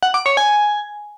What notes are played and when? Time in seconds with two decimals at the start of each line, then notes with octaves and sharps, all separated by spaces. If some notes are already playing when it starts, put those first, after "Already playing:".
0.03 F#5
0.14 D6
0.26 C#5
0.37 G#5